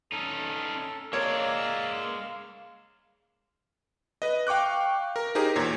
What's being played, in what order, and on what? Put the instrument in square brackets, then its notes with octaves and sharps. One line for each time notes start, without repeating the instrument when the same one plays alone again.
[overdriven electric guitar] C#4 D#4 [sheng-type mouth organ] A4
[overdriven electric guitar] G#3 D5 [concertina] A#3 E6 [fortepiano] C#5 [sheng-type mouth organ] F5
[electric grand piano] B4 D#5
F5 G5 C#6 D6 F#6
A#4
D#4 G4 G#4 A#4 C5
E2 A#2 C#5 G#6